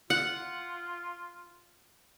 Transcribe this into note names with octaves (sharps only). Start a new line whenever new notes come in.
F4 F#5